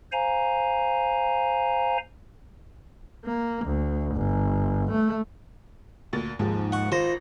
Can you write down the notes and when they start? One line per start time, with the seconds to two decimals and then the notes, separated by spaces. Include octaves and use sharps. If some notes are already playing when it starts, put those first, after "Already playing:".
0.12 C5 F5 G#5 A#5
3.25 A#3
3.65 D2
4.15 G1
4.91 A3
6.13 D2 A#2 A6
6.39 D#2 G#2 F3
6.72 F#5 C#6
6.92 G#1 F4 C5 A#6